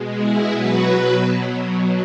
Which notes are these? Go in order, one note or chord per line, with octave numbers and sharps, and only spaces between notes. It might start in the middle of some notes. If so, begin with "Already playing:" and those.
Already playing: B2 G#3
E4 G#4
B2 F#3 F#4 B4
B2 F#3